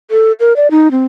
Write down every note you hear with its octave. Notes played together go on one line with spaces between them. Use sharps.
A4
A#4
D5
D#4
C4